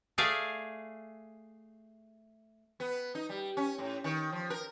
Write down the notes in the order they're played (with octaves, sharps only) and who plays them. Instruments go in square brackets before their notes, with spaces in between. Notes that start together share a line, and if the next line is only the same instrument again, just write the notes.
[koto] A3 G#4 D5 F5
[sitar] B3
D#4
G3
C#4
A2
D#3
F3
A#4